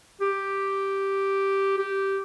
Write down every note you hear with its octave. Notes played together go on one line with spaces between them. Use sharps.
G4
G4